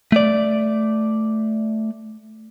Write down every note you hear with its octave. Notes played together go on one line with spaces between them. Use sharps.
A3 D5